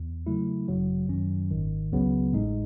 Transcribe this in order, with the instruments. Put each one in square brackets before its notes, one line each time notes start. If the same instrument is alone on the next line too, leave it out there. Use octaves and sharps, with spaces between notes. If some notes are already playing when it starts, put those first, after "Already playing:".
Already playing: [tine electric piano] E2
C#3 F#3 A3 E4
G#1 F#2 C#3 F#3
F#2 D#3 F#3 C#4
G#1 G#2 D#3
C#2 C#3 F#3 B3
A1 A2 G#3 D#4